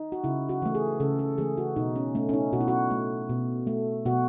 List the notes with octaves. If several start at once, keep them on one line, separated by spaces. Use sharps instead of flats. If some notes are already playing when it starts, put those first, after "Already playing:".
Already playing: D#4
F#4
C#3 E4
F#4
E3 A3
G#4
C#3 A4
A4
E3 A3 G#4
F#4
B2 D#4
C#4
A3 C#4
C#4
D#4
B2 F#4
E4
F#4
A3
B2
A3
B2 F#4